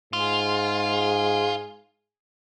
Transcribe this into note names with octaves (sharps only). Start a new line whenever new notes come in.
G#2 F4 G#4